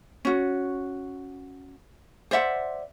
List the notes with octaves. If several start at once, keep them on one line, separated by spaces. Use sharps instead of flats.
C#4 F#4
C5 D5 E5 F#5